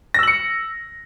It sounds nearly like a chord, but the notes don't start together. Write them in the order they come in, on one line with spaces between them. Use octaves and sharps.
A#6 E6 F#7 C#7